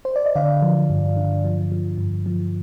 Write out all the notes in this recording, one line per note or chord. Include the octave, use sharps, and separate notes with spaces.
C5
D5
D#5
D3 D5 F5
F3
G2
D3
F3
F3
G2
F3